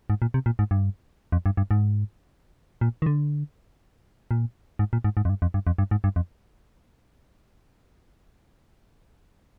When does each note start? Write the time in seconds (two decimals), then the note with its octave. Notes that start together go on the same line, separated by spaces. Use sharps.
0.10 G#2
0.22 A#2
0.34 C3
0.46 A#2
0.59 G#2
0.71 G2
1.32 F2
1.46 G2
1.57 G2
1.71 G#2
2.81 A#2
3.02 D#3
3.06 D3
4.31 A#2
4.79 G#2
4.93 A#2
5.04 G#2
5.17 G#2
5.25 F2
5.29 G2
5.42 F2
5.54 G2
5.67 F2
5.78 G2
5.91 G#2
6.04 G2
6.16 F2